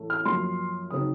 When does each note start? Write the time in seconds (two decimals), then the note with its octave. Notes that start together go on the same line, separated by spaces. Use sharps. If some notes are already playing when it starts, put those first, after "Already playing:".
Already playing: A1 A2 A3
0.10 F6
0.25 F#2 F3 A#3 C6
0.91 C#3 F#3 C4 D#4 D#6